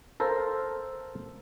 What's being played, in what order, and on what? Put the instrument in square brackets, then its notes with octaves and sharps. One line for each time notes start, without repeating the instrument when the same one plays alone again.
[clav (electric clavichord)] A4 A#4 C5 F5